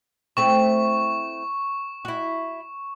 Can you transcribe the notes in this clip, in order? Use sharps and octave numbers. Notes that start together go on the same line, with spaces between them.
A3 C4 E4 C#6
E4 F#4